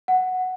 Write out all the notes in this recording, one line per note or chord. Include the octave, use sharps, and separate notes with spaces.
F#5